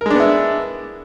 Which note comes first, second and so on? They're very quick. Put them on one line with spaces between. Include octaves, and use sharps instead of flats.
A#4 G#3 D4 B3 E4